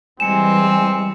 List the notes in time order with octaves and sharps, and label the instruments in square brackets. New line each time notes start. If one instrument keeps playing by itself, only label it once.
[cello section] E3 G3 G#3 [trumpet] C4 [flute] G#5 [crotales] C#7 E7